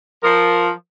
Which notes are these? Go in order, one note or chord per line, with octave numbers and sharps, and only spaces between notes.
F3 A#4